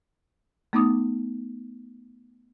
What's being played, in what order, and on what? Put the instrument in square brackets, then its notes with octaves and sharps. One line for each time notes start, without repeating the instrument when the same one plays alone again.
[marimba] A3 B3 D#4 B5 D6 D#6